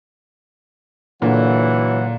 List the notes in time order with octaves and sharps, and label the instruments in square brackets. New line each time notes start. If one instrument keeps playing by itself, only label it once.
[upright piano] A#2 D3 [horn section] E3 F#3 F#5